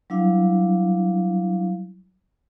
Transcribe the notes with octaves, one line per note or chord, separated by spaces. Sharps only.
F#3 G3 D4 E4 F5